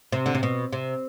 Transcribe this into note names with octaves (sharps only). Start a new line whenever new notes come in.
C3
D3
C3
B2
C3